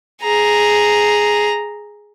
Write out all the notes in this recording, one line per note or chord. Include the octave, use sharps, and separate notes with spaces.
G#4 A#5